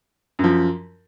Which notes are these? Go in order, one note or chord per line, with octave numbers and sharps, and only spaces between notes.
F#2
F3